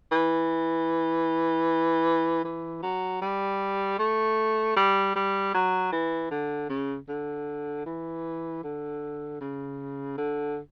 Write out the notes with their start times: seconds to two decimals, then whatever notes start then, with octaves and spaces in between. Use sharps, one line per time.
0.12 E3
2.44 E3
2.83 F#3
3.22 G3
3.99 A3
4.76 G3
5.16 G3
5.54 F#3
5.92 E3
6.31 D3
6.69 C#3
7.09 D3
7.86 E3
8.64 D3
9.41 C#3
10.18 D3